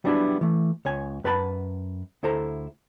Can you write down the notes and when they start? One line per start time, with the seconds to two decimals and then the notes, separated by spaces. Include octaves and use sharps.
0.04 F#3 G3 B3 D4 E4 F#4
0.41 E3 A3
0.85 C#2 C#5 G#5
1.24 F#2 B4 F#5 A5 B5
2.23 D2 E4 A4 C5 A#5